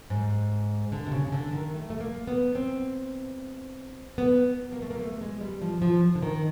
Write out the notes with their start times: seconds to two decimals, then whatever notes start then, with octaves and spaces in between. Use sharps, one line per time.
0.10 G#2
0.92 D3
1.07 C3
1.12 C#3
1.27 C#3
1.32 D3
1.53 D#3
1.74 A3
1.90 A3
2.00 A#3
2.27 B3
2.55 C4
4.18 B3
4.72 A#3
4.82 A3
4.91 A#3
5.00 A3
5.21 G#3
5.41 G3
5.62 F3
5.82 F3
6.15 D3
6.23 D#3